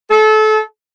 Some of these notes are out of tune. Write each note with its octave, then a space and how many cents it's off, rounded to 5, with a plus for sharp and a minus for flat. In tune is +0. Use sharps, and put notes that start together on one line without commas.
A4 -30